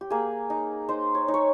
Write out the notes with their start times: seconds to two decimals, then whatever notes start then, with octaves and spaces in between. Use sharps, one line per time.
0.01 G4
0.10 A#3 G#4
0.50 D#4
0.89 D#4 C5
1.15 C#5
1.28 D#4
1.34 C#5